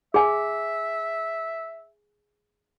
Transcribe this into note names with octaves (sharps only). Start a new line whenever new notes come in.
G#4 E5 G#5